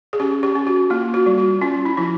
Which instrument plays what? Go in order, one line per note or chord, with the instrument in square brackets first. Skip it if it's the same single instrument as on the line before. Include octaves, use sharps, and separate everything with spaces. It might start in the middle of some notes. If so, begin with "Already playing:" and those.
[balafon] G#4
C#4 G4
G4
C#4
F#4
A#3 F4
F#4
G3
F#4
C#4 F4
E4
F3 E4